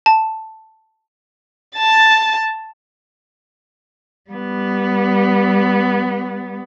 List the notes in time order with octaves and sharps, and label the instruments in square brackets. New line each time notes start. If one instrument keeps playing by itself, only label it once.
[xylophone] A5
[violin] A5 A6
[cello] G3 B3